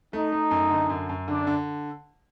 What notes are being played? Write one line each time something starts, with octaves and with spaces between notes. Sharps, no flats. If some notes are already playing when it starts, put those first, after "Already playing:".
A3 D#4
A3
F#2
D3
F#2
F#2
D3 D4
D3